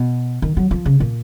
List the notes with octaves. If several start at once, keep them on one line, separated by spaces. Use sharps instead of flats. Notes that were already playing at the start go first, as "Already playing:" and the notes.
Already playing: B2
D#3
F#3
F3
C#3
A#2